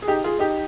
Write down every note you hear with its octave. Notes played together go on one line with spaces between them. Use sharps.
G#4
D#4 G4
F4 G#4
D#4 G4